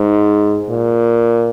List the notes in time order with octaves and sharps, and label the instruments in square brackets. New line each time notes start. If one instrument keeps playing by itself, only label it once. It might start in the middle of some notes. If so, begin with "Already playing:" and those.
Already playing: [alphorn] G#2
A#2